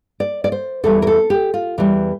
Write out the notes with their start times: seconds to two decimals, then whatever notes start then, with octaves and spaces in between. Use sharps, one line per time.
0.20 D5
0.44 D5
0.52 C5
0.84 E2 E3 G3 A4
1.02 A#4
1.07 A4
1.30 G4
1.54 F4
1.78 E2 E3 G3